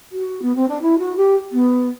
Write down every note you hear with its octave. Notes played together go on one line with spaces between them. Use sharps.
F#4
B3
C4
D4
E4
F#4
G4
B3